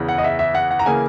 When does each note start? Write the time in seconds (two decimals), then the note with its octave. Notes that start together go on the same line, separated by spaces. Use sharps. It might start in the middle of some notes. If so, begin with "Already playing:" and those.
Already playing: E2 C#3 E3
0.08 F#5
0.18 D#5
0.24 E5
0.39 E5
0.55 F#5
0.71 F#5
0.79 A#5
0.86 C#3 E3 A#3 G#5